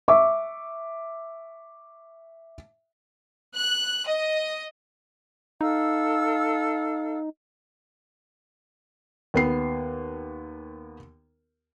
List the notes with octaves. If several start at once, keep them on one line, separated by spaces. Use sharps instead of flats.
E5 C#6 D6
F#6
D#5
D#4 A4 F5 E6
D#2 B3 C7